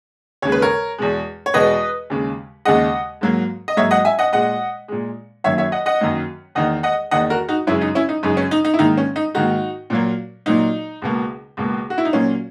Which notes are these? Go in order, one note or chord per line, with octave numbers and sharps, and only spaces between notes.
D#2 C#3 G#3 C#5
B4
A#4 C#5
E2 B2 G#3
C#5
E2 B2 G#3 B4 D#5
D#2 C#3 G#3
D#2 C#3 G#3 D#5 F#5
G#2 F#3 A#3
D#5
G#2 F#3 A#3 C#5 E5
D#5 F#5
E5 G#5
D#5 F#5
A#2 G#3 D#5 F#5
A#2 G#3
F#2 D#3 F#3 A#3 C#5 E5
C#5 E5
D#5 F#5
D#5 F#5
F#2 D#3 F#3 A#3
E2 D#3 A#3 D#5 F#5
D#5 F#5
E2 D#3 A#3 D#5 F#5
F#4 A#4
D#4 F#4
F#2 C#3 G#3 C#4 E4
D#4
C#4 E4
D#4
F#2 C#3 G#3 D#4
C#4
D#4
D#4
E4
G#2 D#3 A#3 D#4
C#4
D#4
G#2 D#3 A#3 D#4 F#4
A#2 F#3 A#3
A#2 F#3 A#3 D#4
C#2 B2 A#3
C#2 B2 A#3
F#4
E4
D#4
A#2 F#3 A#3 C#4